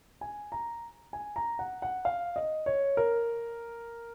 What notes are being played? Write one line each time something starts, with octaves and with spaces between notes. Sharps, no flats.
G#5
A#5
G#5
A#5
F#5
F#5
F5
D#5
C#5
A#4